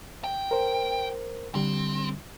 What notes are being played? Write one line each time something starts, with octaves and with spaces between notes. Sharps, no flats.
G5
A#4 C5
D3 G3 C4